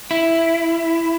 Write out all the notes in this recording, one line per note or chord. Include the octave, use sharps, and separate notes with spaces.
E4